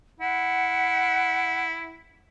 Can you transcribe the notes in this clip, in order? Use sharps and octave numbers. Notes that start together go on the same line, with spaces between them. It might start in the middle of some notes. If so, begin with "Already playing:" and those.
E4 F#5